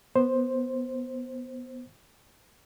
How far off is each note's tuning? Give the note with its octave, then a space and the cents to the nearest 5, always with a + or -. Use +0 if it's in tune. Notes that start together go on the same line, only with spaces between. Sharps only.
B3 +0 C5 +5